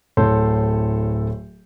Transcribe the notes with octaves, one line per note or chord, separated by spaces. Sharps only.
D1 A2 A4 C#5 C6 G6